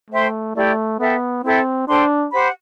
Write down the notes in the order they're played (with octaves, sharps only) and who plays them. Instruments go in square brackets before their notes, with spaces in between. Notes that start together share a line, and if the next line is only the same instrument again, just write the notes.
[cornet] A3 [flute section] C5 E5 G5 C6
[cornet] A3 [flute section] E4 G4 D5
[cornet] B3 [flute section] A4 E5 G5
[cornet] C4 [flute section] E4 A4 E5 G5
[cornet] D4 [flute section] A4 C5 G5 C6
[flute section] G4 C5 F#5 B5